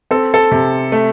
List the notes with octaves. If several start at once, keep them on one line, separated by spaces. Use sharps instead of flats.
C4 A4
A4
C3
A3